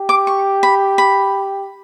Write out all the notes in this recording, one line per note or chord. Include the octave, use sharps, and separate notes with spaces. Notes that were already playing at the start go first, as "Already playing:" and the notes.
Already playing: G4
D6
C#6
B5
B5